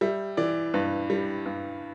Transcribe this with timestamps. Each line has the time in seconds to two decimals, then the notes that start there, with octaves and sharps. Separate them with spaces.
0.01 G3 E5
0.37 E3 D5
0.74 G2 B4
1.10 G3
1.46 G2